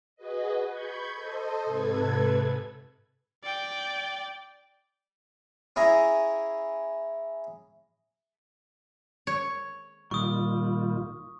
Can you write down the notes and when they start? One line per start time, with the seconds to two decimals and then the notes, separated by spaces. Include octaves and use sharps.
0.16 F#4 G#4 B4 D#5
0.68 B5 C#6 G6 G#6
1.13 A4 C5 D#5
1.64 G#2 C3 A4 B4 G#6
3.43 D5 G5
5.76 C#4 E4 G#4 A#5
9.27 C#5
10.11 A#2 D#3 G3 F4 C#6 D#6